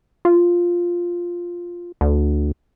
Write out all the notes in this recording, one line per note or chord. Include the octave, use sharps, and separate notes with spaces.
F4
D2